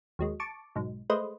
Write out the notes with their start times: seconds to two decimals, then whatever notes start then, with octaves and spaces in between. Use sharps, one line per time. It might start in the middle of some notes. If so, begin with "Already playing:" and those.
0.19 D#2 F#3 G#3
0.40 A5 C#6 D6
0.76 B1 G#2
1.10 G#3 A3 B4 C5 D#5